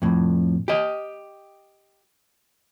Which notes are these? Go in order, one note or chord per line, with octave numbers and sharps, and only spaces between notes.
F2 A2
G4 D#5